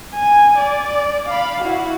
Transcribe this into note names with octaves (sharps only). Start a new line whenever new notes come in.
G#5
D5
F5 B5
E4 F#4